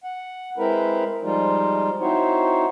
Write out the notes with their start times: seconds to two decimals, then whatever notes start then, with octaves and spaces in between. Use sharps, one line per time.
0.04 F#5
0.58 G#3 C4 E4 A#4 B4
1.23 F3 G3 G#3 D#4 F4
2.01 C4 D#4 E4 F#4 C5 C#5